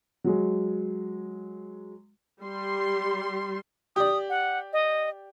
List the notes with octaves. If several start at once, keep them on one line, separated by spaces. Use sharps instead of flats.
F#3 G#3
G3 C6
G4 D5 D#6
F#5
D#5